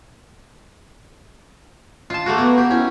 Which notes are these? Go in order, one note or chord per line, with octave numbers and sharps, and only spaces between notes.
F4 A5
A3 A#3 F#4
A#3 B3
G4
C#4 E4